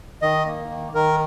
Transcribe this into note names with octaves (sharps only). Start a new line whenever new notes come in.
D#3 D#5
A#3
D#3
D#3 A#4